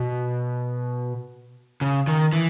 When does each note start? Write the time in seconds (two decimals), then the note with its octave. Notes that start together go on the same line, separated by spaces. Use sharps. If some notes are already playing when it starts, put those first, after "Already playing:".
Already playing: B2
1.81 C#3
2.07 D#3
2.33 E3